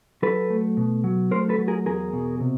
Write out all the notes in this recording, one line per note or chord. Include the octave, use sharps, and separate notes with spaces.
F#3 A4 B4
A3
B2
F#3
A3 A#4 C5
A4 B4
F#3
G#4 A#4
E2 G#4 A#4
B2
C3